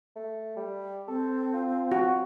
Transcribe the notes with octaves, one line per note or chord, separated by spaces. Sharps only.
A3
G3
C4 A4
F4
F#4